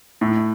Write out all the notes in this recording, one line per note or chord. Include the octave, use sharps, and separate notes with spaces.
A2